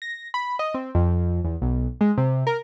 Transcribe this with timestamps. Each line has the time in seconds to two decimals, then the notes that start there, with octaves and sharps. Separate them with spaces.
0.02 A#6
0.34 B5
0.59 D#5
0.74 C4
0.95 F2
1.44 E2
1.62 B1
2.01 G#3
2.18 C3
2.47 A#4